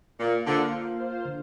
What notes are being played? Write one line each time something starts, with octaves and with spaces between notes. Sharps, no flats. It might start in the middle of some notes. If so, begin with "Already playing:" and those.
A#2 A#3
D3 F4 C5 F5
A#3
F4 C5 F5
D3